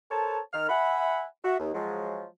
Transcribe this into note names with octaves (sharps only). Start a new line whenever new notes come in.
A4 A#4 C5 C#5 A5
D#3 F6
E5 F#5 G#5 B5
F#4 E5
D#2
F3 F#3 G#3